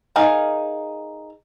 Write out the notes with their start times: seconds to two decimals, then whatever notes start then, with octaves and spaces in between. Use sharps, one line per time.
0.16 D#4 G#4 A#4 F5 A#5